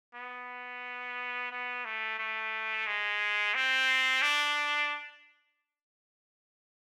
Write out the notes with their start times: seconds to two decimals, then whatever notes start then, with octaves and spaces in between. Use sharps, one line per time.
0.15 B3
1.51 B3
1.85 A3
2.19 A3
2.86 G#3
3.55 C4
4.22 D4